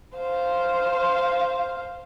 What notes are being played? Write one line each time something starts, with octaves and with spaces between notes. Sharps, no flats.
C5 F5